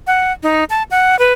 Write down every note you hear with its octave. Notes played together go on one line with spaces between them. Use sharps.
F#5
D#4
A5
F#5
B4